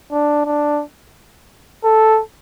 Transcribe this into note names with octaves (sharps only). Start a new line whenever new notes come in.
D4
D4
A4